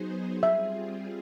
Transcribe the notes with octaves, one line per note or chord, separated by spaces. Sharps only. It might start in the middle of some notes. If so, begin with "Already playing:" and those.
Already playing: F#3 B3 D#4 G#4 C5
G3 C4 F4 G#4 E5